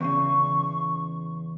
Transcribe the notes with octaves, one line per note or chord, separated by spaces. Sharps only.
E2 A2 C#3 C#6